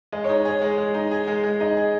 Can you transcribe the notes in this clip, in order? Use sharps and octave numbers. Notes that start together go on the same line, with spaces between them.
G#3 D#5
D#4 C#5
G#4 C#5
G#3
G#3
D#4
G#4
G#3
G#3
D#4 D#5
G#4